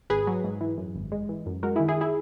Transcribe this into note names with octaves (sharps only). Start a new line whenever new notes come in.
G#1 G#4 B4
F#3
G#2
E3
F#2
G#1
G#3
E3
F#2
G#3 F#4 A#4
E4 G#4
D#3
E4 G#4
E4 G#4